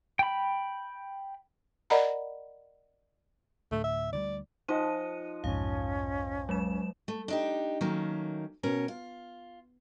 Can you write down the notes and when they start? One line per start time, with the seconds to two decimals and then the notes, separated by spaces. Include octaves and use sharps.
0.19 G5 B5
1.90 A#4 D5 D#5 F#5 A#5 B5
3.72 D2 A2 A3
3.84 E5
4.12 D2 D#3 G3 D5
4.68 F3 D#4 D#5 F#5 D#7
5.44 B1 F2 G#2 C#4 F5
6.49 F#3 G#3 E7
7.08 A3
7.28 D4 D#4 G4
7.81 D#3 F#3 A3 A#3 C#4
8.63 B2 C#4 A#4
8.88 F4